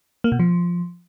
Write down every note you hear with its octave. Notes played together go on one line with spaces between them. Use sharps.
A#3
B2
F3